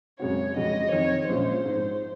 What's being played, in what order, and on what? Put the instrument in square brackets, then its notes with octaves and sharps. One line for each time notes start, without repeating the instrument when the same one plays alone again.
[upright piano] F#2 C#3 G#3 C4 F#4 [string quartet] C#5
[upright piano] F2 C#3 G#3 C#4 F#4 [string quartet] D#5
[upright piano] F2 C3 D#3 [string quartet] C#5
[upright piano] A#1 A#2 G#3 C#4 F4 [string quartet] C5
[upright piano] G#2 F3 G#3